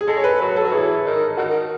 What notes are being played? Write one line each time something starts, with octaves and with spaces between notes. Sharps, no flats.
G#4
G#3 A4
C#5
B4
F#3 B4
A4
F#3
E3 G#4
D#3
D#3 F#4